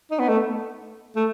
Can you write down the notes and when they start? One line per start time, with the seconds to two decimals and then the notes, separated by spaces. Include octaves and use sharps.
0.11 D#4
0.19 B3
0.29 A3
1.16 A3